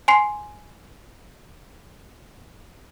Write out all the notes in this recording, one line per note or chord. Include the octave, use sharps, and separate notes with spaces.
G#5 C6 C7